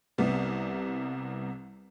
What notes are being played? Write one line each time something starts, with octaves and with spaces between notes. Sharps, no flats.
C2 C3 G3 B3